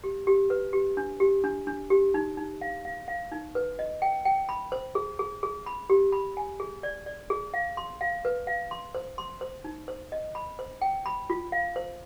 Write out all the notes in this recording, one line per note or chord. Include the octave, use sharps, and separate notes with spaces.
G4
G4
B4
G4
D4
G4
D4
D4
G4
D#4
D#4
F5
F5
F5
D#4
B4
D#5
G5
G5
B5
C5
G#4
G#4
G#4
B5
G4
B5
G#5
G#4
D5
D5
G#4
F5
C6
F5
B4
F5
C6
C5
C6
C5
D#4
C5
D#5
B5
C5
G5
B5
F4
F5
C5